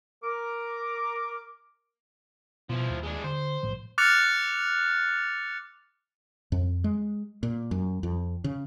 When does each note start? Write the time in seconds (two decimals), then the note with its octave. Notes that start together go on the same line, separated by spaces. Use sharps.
0.24 A#4 D6
2.70 B2 F3 B3 E4
2.90 D#2
3.03 G#3 D4
3.24 D3 C5
3.63 B1 A2 F3
3.98 D6 F6 F#6 A6 C#7 F7
6.52 F2
6.84 G#3
7.43 A#2
7.71 F#2
8.03 F2
8.44 C#3